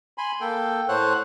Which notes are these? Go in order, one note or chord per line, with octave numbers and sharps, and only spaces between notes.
G#5 B5 C6
A#3 A4 G5
A2 A3 C5 C#5 F#5 F#6